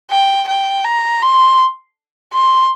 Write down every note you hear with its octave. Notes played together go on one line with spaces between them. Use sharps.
G5
G5
A#5
C6
C6